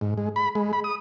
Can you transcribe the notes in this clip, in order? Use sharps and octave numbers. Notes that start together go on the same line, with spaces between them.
G#2
G#3
B5
G#3
B5
D#6